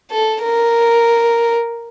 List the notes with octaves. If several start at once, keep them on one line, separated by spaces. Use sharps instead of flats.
A4
A#4